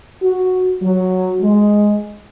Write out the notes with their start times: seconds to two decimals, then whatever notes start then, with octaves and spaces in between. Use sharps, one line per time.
0.22 F#4
0.82 F#3
1.42 G#3